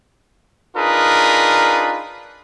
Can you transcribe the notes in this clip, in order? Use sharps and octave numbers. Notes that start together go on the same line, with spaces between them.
D4 D#4 F4 G#4 A#4 B4